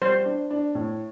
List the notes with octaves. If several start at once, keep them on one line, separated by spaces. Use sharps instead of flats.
G3 C5
D4
D4
A2